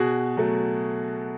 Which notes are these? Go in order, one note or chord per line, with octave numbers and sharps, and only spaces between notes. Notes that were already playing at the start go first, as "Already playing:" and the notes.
Already playing: B2 F#4 G#4
F#3 A3